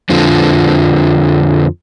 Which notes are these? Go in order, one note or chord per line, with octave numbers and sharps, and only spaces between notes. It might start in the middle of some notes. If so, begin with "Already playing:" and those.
F2 D3 F3